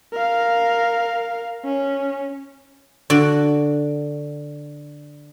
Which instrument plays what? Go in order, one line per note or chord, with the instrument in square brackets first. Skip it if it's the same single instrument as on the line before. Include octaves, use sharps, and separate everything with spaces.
[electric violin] A#4 F5
C#4
[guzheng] D3 F#4 D5